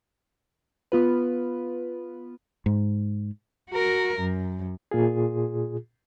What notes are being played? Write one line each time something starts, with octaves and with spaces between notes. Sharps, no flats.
B3 F4 B4
G#2
F#4 A#4
F#2
A#2 F4 G#4